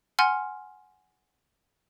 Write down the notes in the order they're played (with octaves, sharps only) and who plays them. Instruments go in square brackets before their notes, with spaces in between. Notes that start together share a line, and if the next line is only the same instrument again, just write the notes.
[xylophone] F#5 G#5 C6 F6